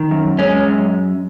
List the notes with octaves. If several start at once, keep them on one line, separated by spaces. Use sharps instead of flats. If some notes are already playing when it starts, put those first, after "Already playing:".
Already playing: D#3
F#2
G#3 C#4
F#2